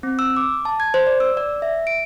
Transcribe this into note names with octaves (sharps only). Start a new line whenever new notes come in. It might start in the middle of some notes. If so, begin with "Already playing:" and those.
C4
E6
D6
A5
G#6
C5
D5
E6
D5
E5
D7